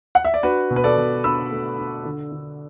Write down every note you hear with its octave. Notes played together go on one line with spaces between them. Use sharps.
F#5
E5
D5
D4 F#4 B4
B2
B4
A4 D5
B2
D4 B5 E6
A3
D4
D3
D3